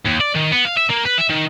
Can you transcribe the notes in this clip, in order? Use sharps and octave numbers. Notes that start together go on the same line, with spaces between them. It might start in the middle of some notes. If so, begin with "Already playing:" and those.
D#2
D5
D#3
B3
F5
E5
A#3
B4
E5
D#3